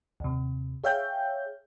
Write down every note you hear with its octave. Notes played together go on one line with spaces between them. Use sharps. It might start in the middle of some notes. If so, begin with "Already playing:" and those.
D#2 C3
G#4 C#5 E5 F5 G5 G6